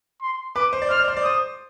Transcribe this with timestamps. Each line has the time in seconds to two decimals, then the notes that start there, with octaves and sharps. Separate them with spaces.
0.22 C6
0.56 B4 D6
0.73 C5
0.82 D5
0.90 C5 F6
1.00 D5
1.08 C5
1.17 D5
1.23 C5 D#6